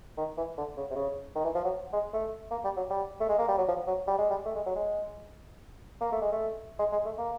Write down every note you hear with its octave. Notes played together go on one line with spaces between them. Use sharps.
D#3
E3
D3
C#3
C3
C#3
D#3
E3
F3
F#3
G#3
A3
A#3
G3
F#3
G3
A3
G#3
A#3
G3
F#3
F3
F#3
G3
G#3
G3
A3
G#3
F#3
G#3
A#3
A3
G#3
A3
G#3
G#3
A3
A#3